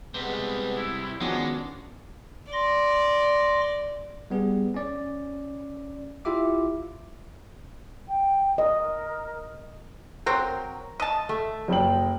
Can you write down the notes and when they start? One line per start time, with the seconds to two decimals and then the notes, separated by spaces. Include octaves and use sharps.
0.14 C3 G3 G#3 B3
0.75 E4
1.20 D#3 F3 G#3 B3 C#4 D4 F#4 C#5
2.52 D5 C6 A#6
4.31 G3 B3 G#4
4.74 C#4 D5
6.25 E4 F4 G4 E5 D6
8.08 G5
8.58 A#4 D#5
10.26 F#3 C4 A#4 G5
11.00 D#5 A5
11.29 A3
11.68 F#1 G5 F#7